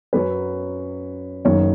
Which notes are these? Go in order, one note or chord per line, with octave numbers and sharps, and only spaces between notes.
F#2 F#3 C#4 B4
F#1 F#2 D#3 C#5